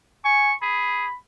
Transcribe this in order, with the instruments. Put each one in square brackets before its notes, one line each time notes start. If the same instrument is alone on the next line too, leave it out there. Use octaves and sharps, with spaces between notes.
[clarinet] G#5 [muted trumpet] C#6
[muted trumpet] G#4 [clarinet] B5